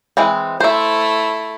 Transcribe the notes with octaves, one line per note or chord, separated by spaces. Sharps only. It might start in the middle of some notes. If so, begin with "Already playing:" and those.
E3 G#3 C4
A3 E4 C5 E5